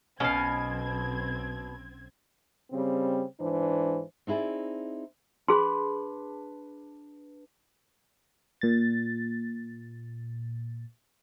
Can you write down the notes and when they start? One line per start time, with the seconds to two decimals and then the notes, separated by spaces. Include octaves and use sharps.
0.20 B1 B2 C4 C#4 F5 G#6
2.72 C#3 G3 C4
3.40 G#2 E3 D4 C5
4.27 C4 D#4 E4 G#4 D5
5.48 D4 G#4 B4 B5 C6
8.61 A#2 A6